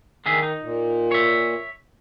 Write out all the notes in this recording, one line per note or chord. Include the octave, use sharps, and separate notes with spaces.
D3 D#3 G#4 E5
D#4
A#2
C#5 E5